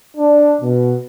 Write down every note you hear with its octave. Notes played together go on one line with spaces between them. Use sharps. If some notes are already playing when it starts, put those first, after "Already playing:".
D4
B2